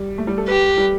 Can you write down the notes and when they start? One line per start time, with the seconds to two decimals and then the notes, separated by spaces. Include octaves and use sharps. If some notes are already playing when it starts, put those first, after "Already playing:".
Already playing: G3
0.18 A3
0.27 G3
0.38 A4
0.48 G4 B4
0.77 G3